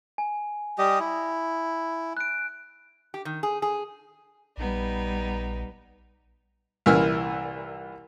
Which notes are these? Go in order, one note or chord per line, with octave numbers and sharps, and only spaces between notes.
G#5
G3 G4 D#5
E4
F#6 D7
G4
D#3
G#4
G#4
A#1 G3 B3 D#4
C2 A#2 E3 E6 F6